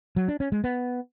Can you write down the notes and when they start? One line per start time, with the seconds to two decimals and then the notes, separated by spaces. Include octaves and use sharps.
0.16 F#3
0.28 D4
0.40 C#4
0.52 G#3
0.64 B3